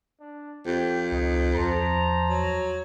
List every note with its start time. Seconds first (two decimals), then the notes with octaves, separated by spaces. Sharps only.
0.21 D4
0.66 F2 G4
1.12 C#2 D#4
1.55 E2 F3 A#5
2.30 F#3